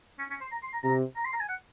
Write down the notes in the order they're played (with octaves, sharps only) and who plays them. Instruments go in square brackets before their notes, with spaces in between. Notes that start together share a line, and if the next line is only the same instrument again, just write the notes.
[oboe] C#4
C#4
C5
A#5
C6
A#5
[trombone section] C3 [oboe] A#5
[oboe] A#5
C6
A#5
G#5
F#5